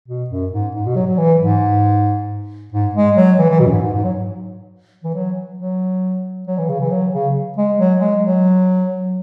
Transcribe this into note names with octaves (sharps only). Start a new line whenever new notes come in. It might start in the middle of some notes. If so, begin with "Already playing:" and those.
B2
F#2
G#2
G#2
B2
F#3
F#3
E3
G#2
G#2
G#3
F#3
E3
E3
B2
F#2
G#2
G#2
G#2
F#3
E3
F#3
F#3
F#3
E3
C#3
E3
F#3
C#3
G#3
F#3
G#3
F#3